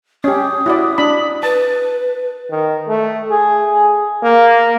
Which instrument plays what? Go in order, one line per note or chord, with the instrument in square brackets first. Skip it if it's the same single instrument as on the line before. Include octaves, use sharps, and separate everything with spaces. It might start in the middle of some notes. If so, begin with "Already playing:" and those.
[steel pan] C#4 G4 [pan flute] D#6
[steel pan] E4 F#4 D5
D4 B5
[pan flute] B4 [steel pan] A5
[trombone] D#3
A3
G#4
A#3